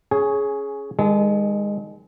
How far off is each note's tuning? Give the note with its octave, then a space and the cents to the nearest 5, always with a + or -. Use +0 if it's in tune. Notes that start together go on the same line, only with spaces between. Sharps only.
C#4 +0 G#4 +10 G#5 -20
D#3 +0 G#3 -25 G#4 +45